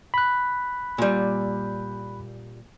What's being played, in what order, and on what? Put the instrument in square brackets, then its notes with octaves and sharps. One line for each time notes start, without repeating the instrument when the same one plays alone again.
[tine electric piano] B5 F#6
[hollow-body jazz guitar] A#2 G3